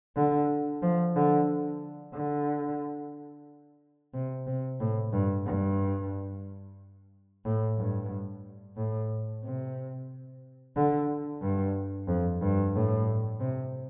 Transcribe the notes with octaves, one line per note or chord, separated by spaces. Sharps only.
D3
F3
D3
D3
C3
C3
A2
G2
G2
A2
G2
A2
C3
D3
G2
F2
G2
A2
C3